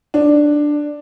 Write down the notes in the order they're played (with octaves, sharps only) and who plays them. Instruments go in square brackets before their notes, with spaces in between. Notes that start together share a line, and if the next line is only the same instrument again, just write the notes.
[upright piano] D4